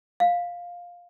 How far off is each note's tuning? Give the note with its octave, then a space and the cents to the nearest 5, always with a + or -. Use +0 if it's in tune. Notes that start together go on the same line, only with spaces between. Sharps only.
F5 +10